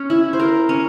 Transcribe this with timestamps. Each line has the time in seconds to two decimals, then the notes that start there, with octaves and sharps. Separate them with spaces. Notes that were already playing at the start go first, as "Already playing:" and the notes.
Already playing: C#4
0.10 E4
0.33 C5
0.40 A#4
0.69 C#4